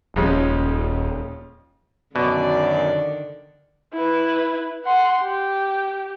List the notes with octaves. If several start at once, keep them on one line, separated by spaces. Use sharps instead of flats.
D#1 F2 G#3 C#4
F#2 B2 D3 D#3 D5
E4 B4
F#5 C6
G4